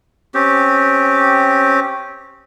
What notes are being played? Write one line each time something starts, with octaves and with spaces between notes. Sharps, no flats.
C4 C#4 G4